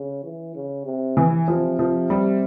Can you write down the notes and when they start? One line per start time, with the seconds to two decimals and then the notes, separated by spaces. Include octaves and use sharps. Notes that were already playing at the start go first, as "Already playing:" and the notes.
Already playing: C#3
0.24 E3
0.55 C#3
0.85 C3
1.17 E3
1.48 C3 F3
1.79 F3
2.10 G3